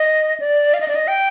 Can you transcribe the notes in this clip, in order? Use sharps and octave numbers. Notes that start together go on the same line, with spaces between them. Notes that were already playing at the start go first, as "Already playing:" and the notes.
Already playing: D#5
D5
F5
D#5
D5
D#5
G5